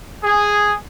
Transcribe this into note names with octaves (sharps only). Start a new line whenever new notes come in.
G#4